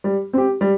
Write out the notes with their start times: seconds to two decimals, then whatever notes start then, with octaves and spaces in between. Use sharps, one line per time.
0.04 G3
0.33 C4 G4
0.61 G3